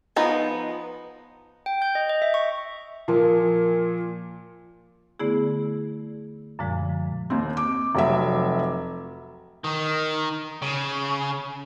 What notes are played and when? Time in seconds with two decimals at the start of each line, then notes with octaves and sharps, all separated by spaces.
0.16 F3 B3 D#4
1.66 G5
1.82 G6
1.95 D#5
2.09 D#5
2.22 E5
2.34 C#6
3.08 A#2 F3 A#3
5.19 D3 A3 B3 E4 G#4
6.59 F#2 A#2 D3 F3 G#3
7.30 D#2 C4
7.57 D6
7.95 F1 F#3 E5
9.64 D#3
10.62 C#3